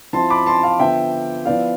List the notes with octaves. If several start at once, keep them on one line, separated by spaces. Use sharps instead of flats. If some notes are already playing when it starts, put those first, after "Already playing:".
F3 C4 E4 A5 C6
B5 D6
A5 C6
F5 A5
D3 F3 B3 E5 G5
F3 B3 E4 D5 F5